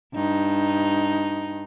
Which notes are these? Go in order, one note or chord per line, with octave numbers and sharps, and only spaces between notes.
G2 D#4